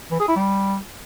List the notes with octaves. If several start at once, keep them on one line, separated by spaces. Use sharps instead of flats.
E3
G#4
E4
G3